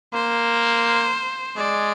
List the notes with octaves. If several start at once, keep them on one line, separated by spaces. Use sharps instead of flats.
A#3 C5
G#3 D5